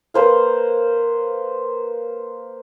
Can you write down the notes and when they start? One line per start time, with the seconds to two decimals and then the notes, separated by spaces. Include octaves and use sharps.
0.14 A#3 B4 C5 F5